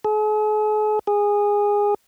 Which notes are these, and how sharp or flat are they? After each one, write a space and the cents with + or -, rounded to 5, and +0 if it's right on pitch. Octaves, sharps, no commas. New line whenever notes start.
G#4 +45
G#4 -15